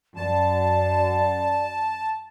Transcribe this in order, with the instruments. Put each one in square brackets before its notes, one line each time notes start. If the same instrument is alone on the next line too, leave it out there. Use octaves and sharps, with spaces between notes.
[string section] F#2 [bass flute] D5 [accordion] A5